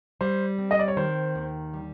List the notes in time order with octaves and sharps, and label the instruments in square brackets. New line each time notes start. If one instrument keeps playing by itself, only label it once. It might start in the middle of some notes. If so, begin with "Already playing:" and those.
[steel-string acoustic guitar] G3 [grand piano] C5
[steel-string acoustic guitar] C4
[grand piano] D#5
D5
C#5
[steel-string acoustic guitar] D#3 [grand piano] C5
[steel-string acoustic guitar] D#2
G3